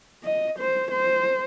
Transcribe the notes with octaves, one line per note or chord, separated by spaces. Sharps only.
D#5
C5
C5